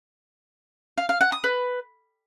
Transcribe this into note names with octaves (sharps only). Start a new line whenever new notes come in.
F5
F5
F#5
D#6
B4